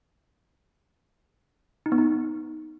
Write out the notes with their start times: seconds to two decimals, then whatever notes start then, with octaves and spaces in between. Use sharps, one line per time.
1.86 D#4
1.92 B3
1.98 D#4